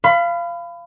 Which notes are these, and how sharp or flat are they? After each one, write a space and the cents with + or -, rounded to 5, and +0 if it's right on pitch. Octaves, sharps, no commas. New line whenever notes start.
F5 -20 B5 +25